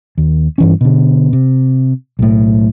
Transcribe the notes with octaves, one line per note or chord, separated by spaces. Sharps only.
D#2
G2 E3 C#4
B2 D3
C3
B1 A2